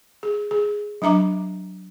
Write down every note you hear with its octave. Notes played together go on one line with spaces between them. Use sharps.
G#4
G#4
F#3 D4 E5 A#5 D6